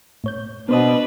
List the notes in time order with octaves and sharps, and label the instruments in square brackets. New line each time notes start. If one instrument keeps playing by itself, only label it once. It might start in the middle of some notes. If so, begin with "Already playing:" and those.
[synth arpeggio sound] A2 C#5 G6
[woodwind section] B2 [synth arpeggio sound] B3 C5 D#6 [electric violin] D4 B4